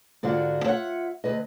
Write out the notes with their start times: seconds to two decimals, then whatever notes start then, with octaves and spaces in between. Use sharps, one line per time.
0.23 G#2 D3 D4 F4 F#4
0.64 F4 C#5 E5 F#5
1.24 D2 B4 D#5